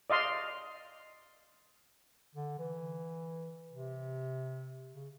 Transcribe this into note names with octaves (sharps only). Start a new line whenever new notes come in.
D5 D#5 F5 C6
D3
E3
C3
C#3